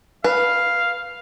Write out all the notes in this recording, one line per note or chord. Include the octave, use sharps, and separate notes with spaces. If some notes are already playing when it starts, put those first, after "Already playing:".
B4 F5